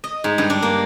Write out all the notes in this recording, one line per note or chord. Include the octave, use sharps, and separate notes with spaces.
D#5
G#2
G2
D4
A#3